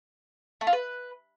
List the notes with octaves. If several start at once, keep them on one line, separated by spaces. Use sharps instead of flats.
A3
F4
B4